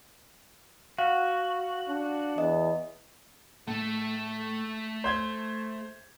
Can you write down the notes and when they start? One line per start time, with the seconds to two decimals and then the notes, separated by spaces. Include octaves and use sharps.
0.98 F#4 F5
1.88 D4
2.38 E2 D#5
3.68 A2 A3 A4
5.04 C5 G6 G#6